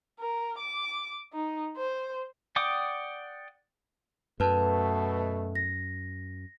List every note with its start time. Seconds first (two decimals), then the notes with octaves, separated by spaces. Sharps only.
0.20 A#4
0.58 D6
1.33 D#4
1.77 C5
2.56 D5 F#5 G5 D6 D#6
4.40 F#2 B2 A3 B4 A5
5.55 A#6